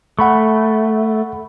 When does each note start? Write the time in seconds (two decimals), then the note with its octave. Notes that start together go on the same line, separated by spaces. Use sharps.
0.19 A3 F#5 B5 C#6